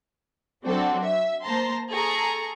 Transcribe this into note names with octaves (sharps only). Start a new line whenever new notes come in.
F#3 C4 D4 F#4 A4
E5
A#3 C5 A5 A#5 C6
G#4 A4 A#5 C#6